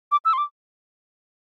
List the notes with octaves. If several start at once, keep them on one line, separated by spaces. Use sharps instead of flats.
D6
E6
C6
D6